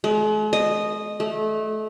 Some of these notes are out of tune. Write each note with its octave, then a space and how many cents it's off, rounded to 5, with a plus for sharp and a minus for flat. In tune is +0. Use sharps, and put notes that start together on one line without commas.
G#3 +45
D#5 -10
A3 -25